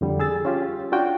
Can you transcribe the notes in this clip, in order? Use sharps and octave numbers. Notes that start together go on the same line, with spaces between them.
F2 D3 G3
G#4 E6 A6
C#4 F4 G4
D4 F4 F#4 G5